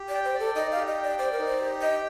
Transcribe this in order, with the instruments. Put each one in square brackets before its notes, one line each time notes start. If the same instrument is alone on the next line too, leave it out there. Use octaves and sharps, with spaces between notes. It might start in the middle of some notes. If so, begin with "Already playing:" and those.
Already playing: [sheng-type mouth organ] G4
[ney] D5
[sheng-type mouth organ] G5
[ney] C5
[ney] A4 [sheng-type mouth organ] D5
[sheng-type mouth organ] D#4 [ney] D#5
[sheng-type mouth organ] G4 [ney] F5
[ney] D#5
[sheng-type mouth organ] G5
[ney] D5
[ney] C5 [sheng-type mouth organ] D5
[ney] A#4
[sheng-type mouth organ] D#4
[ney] C5
[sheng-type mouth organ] G4
[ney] D#5 [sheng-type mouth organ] G5